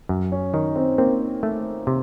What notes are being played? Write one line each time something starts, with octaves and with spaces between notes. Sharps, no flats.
F#2
C#4
D#3 D#4
C4
A#3 C4
A3
C3